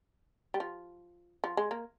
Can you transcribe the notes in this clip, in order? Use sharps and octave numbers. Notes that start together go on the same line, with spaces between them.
G3
F3
F3
G#3
A#3